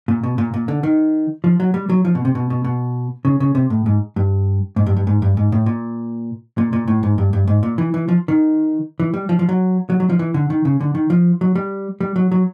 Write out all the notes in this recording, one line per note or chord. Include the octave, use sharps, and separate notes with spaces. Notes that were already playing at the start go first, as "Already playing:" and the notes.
A#2
B2
A#2
A#2
D3
D#3
F3
F#3
G3
F#3
F3
B2
C3
B2
B2
B2
C#3
C#3
C3
A2
G#2
G2
G#2
G2
G2
G#2
G2
G#2
A2
A#2
A#2
A#2
A2
G#2
G2
G2
G#2
A#2
E3
E3
F3
D#3
E3
G3
F3
F3
F#3
F#3
F#3
F3
E3
D3
D#3
C#3
D3
D#3
F3
F#3
G3
G3
F#3
F#3